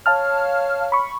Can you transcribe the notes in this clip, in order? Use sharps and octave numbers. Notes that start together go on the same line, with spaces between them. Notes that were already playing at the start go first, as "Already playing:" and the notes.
C#5 F5 A5 F6
B5 C#6